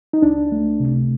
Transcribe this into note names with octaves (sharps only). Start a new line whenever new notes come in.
D#4
C#2 D4
A3
C3